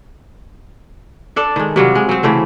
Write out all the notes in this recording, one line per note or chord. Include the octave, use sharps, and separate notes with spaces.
D4 A4 D5
D#3 G#3
C3 F#3 G3 F4
G#3
F#3 C4
C#3 E3 A3 C5